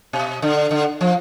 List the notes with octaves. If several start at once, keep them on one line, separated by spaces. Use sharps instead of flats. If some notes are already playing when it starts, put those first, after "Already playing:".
B2
D3
D3
F3